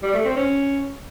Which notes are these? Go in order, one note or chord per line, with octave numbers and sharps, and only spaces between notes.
G3
A3
C4
C#4